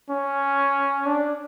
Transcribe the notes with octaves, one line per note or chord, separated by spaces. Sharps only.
C#4
D4